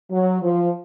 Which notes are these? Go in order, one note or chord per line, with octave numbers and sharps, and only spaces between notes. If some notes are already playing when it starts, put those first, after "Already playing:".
F#3
F3